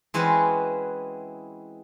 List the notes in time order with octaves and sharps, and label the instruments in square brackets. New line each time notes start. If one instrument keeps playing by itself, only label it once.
[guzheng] E3 G#3 C4 C#4 F#4 B4